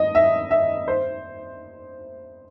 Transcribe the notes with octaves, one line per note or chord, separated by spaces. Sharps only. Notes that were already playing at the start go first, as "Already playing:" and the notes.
Already playing: D#5
E5
E5
C5